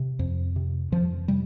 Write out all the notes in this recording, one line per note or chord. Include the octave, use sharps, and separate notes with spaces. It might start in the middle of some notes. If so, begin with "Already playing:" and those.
Already playing: C3
F2
C3
F2 F3
C3 G3